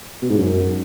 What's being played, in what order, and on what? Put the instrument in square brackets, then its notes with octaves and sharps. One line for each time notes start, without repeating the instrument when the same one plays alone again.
[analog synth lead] B2
G#2
F#2